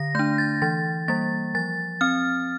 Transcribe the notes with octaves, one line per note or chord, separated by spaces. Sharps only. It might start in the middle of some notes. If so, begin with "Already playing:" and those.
Already playing: D3 A#6
A3 D4 G6
A6
E3 A6
G3 A#3 A6
F3 A6
C4 F6